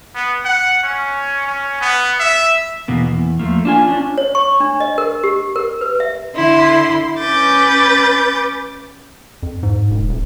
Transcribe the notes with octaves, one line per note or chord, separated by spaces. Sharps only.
B3
F#5
C#4
C#4
B3
E5
E2 B2 A#3
E2
F3 A3 A#3
D4 F4 G#5
C#4 D4
C#5
C#6
D4
D#5
A#4
G4
A#4
B4
E5
D3 E4 C6
C#4 B4 D6 G6 A6
F2
G#2
E1
D#1